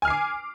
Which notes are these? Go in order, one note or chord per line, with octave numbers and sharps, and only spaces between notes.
G#5 D6 F6 C7